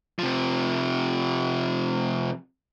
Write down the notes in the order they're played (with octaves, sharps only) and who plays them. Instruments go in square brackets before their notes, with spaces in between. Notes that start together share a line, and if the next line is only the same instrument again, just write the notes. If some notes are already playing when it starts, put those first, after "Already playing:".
[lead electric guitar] C3 F3